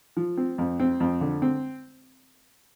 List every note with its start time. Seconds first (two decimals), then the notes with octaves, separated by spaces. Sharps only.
0.17 F3
0.37 C4
0.58 F2
0.80 C4
1.00 F2
1.21 D3
1.42 C4